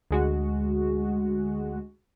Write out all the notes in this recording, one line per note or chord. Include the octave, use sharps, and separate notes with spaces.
D2 G#3 F#4